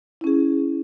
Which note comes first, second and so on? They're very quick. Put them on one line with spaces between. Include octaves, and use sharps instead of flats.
E4 C#4 G#4